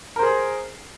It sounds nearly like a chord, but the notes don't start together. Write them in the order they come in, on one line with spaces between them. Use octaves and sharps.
A#4 C5 G#4